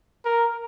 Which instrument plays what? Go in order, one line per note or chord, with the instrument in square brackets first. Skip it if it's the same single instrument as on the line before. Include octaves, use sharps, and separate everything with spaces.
[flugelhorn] A#4